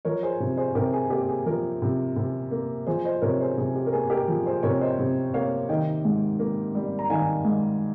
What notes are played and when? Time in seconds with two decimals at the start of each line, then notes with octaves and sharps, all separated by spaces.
0.05 F3 A#4 C#5
0.23 G#4 C5
0.40 C3
0.57 G#4 C5
0.75 C3 G4 A#4
0.93 G#4
1.10 A#3 G4
1.28 G#4
1.46 F3 G4 A#4
1.82 C3
2.16 C3
2.51 A#3
2.86 F3 G#4 C5
3.04 C5 D#5
3.22 C3 A#4 C#5
3.40 G#4 C5
3.58 C3 G#4
3.75 G4
3.87 A#4
3.93 A#3 G#4
4.10 G4 A#4
4.28 F3 G#4
4.46 G#4 C5
4.63 C3 A#4 C#5
4.81 C5 D#5
4.99 C3
5.34 A#3 C#5 F5
5.69 D#3 D#5 G5
6.05 G#2
6.39 A#3
6.75 G3
6.99 A#5
7.10 D#3 F5 G#5
7.45 G#2